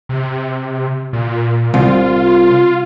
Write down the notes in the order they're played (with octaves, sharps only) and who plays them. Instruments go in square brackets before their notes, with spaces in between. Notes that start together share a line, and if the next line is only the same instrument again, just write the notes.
[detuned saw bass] C3
A#2
[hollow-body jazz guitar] C2 [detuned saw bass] F4